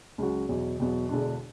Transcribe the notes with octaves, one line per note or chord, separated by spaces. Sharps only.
C#2 C#3 F#3 C#4 F#4
E2 B2 F#3
E2 B2 F#3
E1 E2 D3 G#3 D4